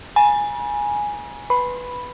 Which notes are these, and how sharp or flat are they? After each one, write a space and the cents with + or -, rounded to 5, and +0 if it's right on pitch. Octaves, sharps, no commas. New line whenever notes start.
G#5 +0 B5 -45
B4 +0 B5 +0